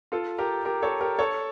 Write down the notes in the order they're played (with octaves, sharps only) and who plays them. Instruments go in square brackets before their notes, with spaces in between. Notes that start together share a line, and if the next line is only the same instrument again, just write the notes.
[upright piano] F4 A4
G4 A#4
G4 A#4
A4 C#5
G4 A#4
A4 C#5